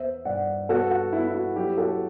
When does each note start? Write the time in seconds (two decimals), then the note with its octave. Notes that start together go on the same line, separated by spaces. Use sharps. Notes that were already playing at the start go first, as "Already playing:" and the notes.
Already playing: E2 B3 C5 E5
0.25 G2 D5 F#5
0.69 B3 F#4 A4
0.91 F#4
1.13 B3 E4
1.27 E4
1.34 F#4
1.56 F#3 E4 G4
1.78 F#4 A4